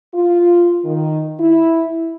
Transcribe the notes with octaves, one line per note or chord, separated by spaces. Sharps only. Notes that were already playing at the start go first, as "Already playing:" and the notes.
F4
D#3
E4